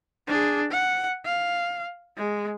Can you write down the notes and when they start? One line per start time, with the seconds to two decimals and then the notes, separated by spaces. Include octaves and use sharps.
0.27 D4 G#4
0.71 F#5
1.25 F5
2.17 G#3